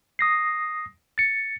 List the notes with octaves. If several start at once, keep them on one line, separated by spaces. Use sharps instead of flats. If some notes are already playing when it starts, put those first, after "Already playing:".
D#6 A#6 C7
A6 C#7